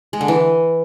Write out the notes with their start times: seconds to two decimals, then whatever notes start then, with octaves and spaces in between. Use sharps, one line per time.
0.13 G#3
0.21 D3
0.28 E3